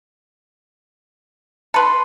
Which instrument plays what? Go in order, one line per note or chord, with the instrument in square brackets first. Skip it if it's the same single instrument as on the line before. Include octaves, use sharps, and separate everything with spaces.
[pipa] A4 B4 [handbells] B5 C6